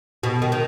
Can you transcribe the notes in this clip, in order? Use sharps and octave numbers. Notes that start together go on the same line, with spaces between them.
B2
D#3
D#3